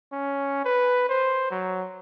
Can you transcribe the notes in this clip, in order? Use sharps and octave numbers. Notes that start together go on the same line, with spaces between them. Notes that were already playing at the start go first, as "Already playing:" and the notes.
C#4
B4
C5
F#3